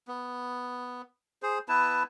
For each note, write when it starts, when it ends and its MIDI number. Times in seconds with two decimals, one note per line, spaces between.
0.08 1.02 59
1.43 1.59 68
1.43 1.59 72
1.69 2.03 59
1.69 2.03 64
1.69 2.03 71
1.69 2.03 81